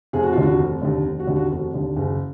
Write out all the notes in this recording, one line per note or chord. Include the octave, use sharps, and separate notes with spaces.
F1 G#4
F#4
D#2 D3 F4
F#4
F1
D#2 D3
F1
F#4
D#2 D3
F#4
F1 F#4
D#2 D3
F#1 G#4